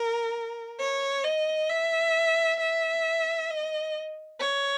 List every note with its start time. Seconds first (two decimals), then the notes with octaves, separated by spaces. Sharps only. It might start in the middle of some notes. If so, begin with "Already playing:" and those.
Already playing: A#4
0.80 C#5
1.25 D#5
1.70 E5
2.60 E5
3.50 D#5
4.40 C#5